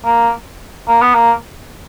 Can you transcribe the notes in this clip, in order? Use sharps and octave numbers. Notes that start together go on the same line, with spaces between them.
A#3
A#3
B3
A#3